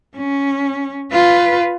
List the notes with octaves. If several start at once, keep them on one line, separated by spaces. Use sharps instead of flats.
C#4
F4 B4